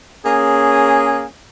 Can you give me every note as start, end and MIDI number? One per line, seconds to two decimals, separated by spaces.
0.25 1.26 58
0.25 1.26 61
0.25 1.26 68